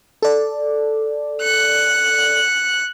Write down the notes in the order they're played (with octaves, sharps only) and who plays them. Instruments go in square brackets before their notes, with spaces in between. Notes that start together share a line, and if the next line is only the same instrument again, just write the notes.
[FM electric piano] A4 D5
[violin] F#6 C#7